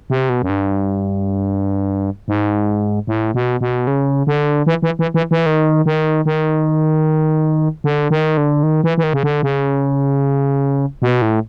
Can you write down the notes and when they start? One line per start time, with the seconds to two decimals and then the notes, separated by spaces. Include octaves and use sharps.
0.10 C3
0.29 B2
0.42 F#2
0.49 G2
2.28 G#2
3.07 A2
3.34 B2
3.61 B2
3.87 C#3
4.27 D3
4.66 E3
4.82 E3
4.99 E3
5.14 E3
5.31 E3
5.46 D#3
5.86 D#3
6.26 D#3
7.84 D3
8.10 D#3
8.37 D3
8.63 D#3
8.84 E3
8.98 E3
9.04 D#3
9.13 C#3
9.23 D3
9.43 C#3
11.02 B2
11.22 A2